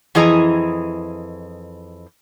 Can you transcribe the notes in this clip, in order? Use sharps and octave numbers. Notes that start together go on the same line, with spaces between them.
F2 E3 E4 G#4 D#5 A#5